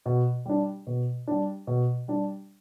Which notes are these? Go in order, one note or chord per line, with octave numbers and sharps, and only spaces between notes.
B2
G3 D4
B2
G3 D4
B2
G3 D4